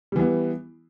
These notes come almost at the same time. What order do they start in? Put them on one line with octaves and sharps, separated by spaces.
G3 E3 B3